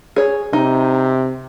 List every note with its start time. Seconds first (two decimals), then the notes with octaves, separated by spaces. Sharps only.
0.16 G#4 C#5
0.53 C3 D#4